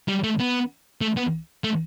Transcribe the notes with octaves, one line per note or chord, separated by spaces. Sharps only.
G3
A3
B3
A3
B3
A3